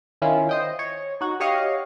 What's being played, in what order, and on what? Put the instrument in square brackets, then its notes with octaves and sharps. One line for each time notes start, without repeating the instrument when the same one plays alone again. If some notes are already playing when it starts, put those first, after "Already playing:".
[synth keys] D#3 C#4 E4 F4
C5 D#5 G5
C#5
D#4 F#4
G4 C#5 D#5 F5 F#5